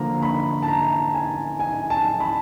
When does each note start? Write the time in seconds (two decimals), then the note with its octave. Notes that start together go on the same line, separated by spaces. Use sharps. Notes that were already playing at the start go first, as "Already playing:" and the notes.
Already playing: D3 F3 A#3 A#5
0.23 B5
0.63 A5
0.68 A#5
1.14 G#5
1.60 G#5
1.90 A5
2.20 B5